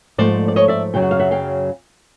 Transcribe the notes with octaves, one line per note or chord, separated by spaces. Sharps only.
G#2 F3 A3 C5 D5
D5
C#5 D#5
D5 E5
F#2 C#3 F#3 G5
F#5
F5
E5 F#5
F5 G5